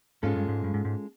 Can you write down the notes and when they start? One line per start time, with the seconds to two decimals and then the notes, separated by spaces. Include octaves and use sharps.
0.23 G#2 G#3 C#4 F4 A4
0.36 G2
0.48 G#2
0.64 G2
0.74 G#2
0.85 G#2